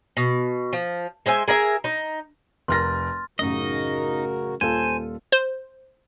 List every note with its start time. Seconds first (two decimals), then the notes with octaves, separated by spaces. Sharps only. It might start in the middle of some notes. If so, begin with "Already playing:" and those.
0.17 B2
0.73 F3
1.26 G#3 C5 E5 G#5
1.48 G#4 A#4 D#5 E5
1.84 D#4
2.68 F1 A#4 C6 F6 A6 A#6
3.39 A1 F#2 C#3 D#4 F#4 A#4 D#5
4.61 D#1 F4 A4 C5 G#5
5.32 C5